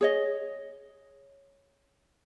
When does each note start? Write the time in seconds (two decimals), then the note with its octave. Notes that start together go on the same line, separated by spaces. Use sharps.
0.01 G#4 C#5 D#5